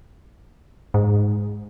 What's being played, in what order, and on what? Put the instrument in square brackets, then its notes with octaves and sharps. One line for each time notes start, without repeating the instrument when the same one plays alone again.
[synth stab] G#2